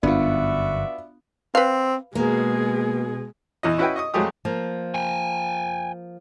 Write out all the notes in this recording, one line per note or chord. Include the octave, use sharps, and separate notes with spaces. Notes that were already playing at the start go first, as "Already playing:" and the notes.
G1 F#2 B3 D4 F4 F#4 D5 E5
C4 B4 F5
B2 G#3 A#3 G#4
E2 E3 D#5
C#4 E4 F#4 B4 D#5 G5
D#5 C#6 D#6
F2 F#3 G#3 A3 G4 D#6
F3 A#3 F4
G5 G#5